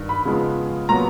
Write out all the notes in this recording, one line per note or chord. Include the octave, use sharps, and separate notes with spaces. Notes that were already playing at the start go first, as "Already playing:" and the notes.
Already playing: G2 D#3
B5
C#3 F3 G#3 B3
A#2 F#3 B3 A#5